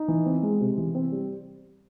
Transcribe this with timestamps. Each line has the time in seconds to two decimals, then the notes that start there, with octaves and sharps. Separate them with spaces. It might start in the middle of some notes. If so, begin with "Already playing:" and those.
Already playing: D#4
0.08 E3
0.26 C4
0.43 G#3
0.60 C3
0.78 E3
0.95 C4
1.12 G3